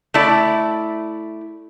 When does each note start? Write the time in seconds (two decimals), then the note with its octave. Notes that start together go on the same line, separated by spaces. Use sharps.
0.14 A3 E4 D5